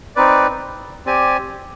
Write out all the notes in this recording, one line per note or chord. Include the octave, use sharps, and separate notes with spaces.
C4 D#4 B4 D5
C4 G4 D5 G#5